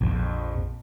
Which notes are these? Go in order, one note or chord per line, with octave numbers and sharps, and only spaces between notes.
A#1 F2